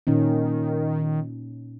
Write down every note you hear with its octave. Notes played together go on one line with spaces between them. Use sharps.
A#2 D#3 C#4 D#4